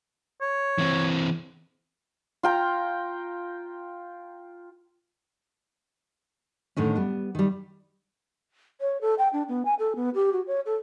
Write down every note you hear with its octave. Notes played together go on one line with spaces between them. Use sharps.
C#5
E3 C4
F4 G5 A#5
A2 D3 D#3 C#4
G3 B3
D#3 G3
C#5
A4
G5
D4
B3
G#5
A4
B3
G4
F#4
C#5
A4